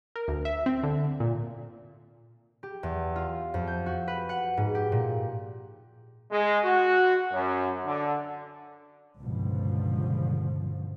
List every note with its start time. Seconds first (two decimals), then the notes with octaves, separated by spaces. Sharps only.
0.16 A#4
0.28 D2
0.45 E5
0.66 C4
0.83 D3
1.20 A#2
2.63 G4
2.83 E2
3.16 F4
3.54 F2
3.67 G6
3.86 F#4
4.08 B4
4.29 F#5
4.57 G#2
4.75 G4
4.92 A#2
6.31 G#3
6.64 F#4
7.33 F#2
7.85 D3
9.20 C#2 G2 B2 D3 F3